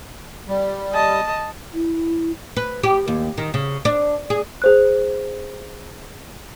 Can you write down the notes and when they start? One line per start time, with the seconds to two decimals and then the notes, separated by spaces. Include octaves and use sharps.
0.48 G3
0.93 D#5 A5
1.74 E4
2.57 B4
2.83 G4
3.08 D#2
3.38 D#3
3.54 C#3
3.85 D4
4.30 G#4
4.62 G#4 C5 F#6